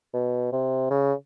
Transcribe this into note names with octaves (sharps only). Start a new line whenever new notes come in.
B2
C3
C#3